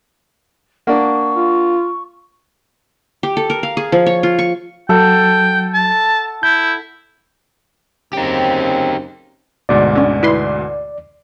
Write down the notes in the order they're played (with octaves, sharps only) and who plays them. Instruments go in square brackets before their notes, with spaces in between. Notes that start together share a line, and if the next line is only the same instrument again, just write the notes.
[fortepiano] A#3 D4 [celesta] F#5 [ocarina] C#6
[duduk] F4
[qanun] G4
A4
A#4
F5
G#4
F3
C#5
F4
C#6
[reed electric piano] F#3 [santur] A4 F#5 [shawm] G5
[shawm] A5
[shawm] E4 [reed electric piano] G6
[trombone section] F#2 C#3 C4 [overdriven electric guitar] D#4 G4
[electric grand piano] D2 G#2 B2 [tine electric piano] D5
[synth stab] D3 C#4
E4 B4 C6